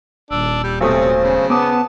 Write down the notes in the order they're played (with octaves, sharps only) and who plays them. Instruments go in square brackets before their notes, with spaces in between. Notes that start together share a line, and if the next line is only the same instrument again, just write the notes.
[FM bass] D#1 [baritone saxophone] D4 [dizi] E6
[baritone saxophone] G3
[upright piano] B1 A3 D#6 [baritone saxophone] C3 [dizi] C5
[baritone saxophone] C#3
[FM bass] B3 [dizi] A5 [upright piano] D6 D#6